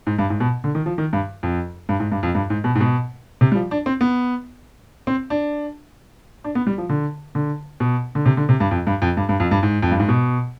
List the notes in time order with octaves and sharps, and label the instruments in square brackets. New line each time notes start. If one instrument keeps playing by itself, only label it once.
[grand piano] G#2
G2
G#2
B2
D3
D#3
F3
D#3
G2
F2
G2
G#2
G2
F2
G2
G#2
B2
G#2
B2
C3
G3
F3
D4
C4
B3
C4
D4
D4
B3
G3
F3
D3
D3
B2
D3
C3
D3
C3
G2
F2
G2
F2
G2
G2
F2
G2
G#2
F2
G2
G#2
B2